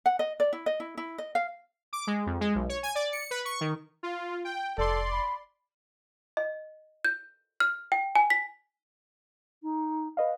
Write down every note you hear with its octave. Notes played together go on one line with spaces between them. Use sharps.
F#5
D#5
D5
E4
D#5
E4
E4
D#5
F5
D6
G#3
F2
G#3
B1
C#5
G#5
D5
C#7
B4
C#6
D#3
F4
G5
F1 A4 D5 C6
B5
D#5
G6
F6
G5
G#5
B6
D#4
B4 D#5 F5